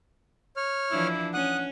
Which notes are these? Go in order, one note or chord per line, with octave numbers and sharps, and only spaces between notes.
C#5 F6
E3 F3 D4 E4
C#4 F#5 D#6 F#6